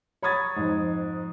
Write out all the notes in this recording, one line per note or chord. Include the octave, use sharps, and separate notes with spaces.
C#5 B5 C#6 D#6 G#6 A6
F2 G#2